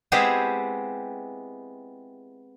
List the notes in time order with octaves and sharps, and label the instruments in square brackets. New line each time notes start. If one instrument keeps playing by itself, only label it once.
[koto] G#3 B3 C4 E4 G4 G#4